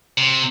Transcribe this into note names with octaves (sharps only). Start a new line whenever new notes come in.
C3